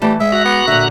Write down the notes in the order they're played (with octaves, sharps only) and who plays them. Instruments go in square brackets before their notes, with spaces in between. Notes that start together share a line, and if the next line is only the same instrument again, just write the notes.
[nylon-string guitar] E3 A3 A5 [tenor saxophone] G3
[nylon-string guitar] G#3 [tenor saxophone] E5
[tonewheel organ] F#4 A#5 F#6
[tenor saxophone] B3
[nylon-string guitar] A#2 D3 [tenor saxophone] E5